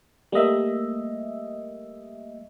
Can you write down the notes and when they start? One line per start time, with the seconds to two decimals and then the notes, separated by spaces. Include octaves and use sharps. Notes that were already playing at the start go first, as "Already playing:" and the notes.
0.32 G3 A3 A#3 D#5 E5